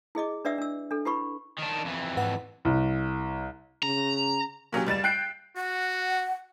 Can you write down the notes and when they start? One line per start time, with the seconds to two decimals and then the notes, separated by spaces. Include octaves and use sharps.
0.15 E4 G#4 D#5 D6
0.45 D4 B4 D5 E5 F#5 E6
0.58 D4 E6
0.91 D4 A4
1.05 E4 G4 B4 B5 C#6
1.58 D#3 D4
1.84 F2 E3
2.17 G#2 B4 F#5
2.65 C2
3.83 C#3 A#5
4.72 A#2 F#3 C#4 G4
4.87 C#2 G3 A6 E7
5.04 G5 F#6 G6 C7 D7
5.57 F#4 F#5